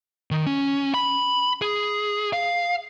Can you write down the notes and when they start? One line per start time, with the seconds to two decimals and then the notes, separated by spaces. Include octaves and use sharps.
0.31 D#3
0.46 C#4
0.94 B5
1.62 G#4
2.33 F5